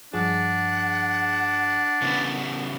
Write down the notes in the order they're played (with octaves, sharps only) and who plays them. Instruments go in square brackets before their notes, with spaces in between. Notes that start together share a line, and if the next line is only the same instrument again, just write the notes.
[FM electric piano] G2 F3 G#4 [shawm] D4 [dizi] F#5
[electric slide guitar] C#3 E3 B3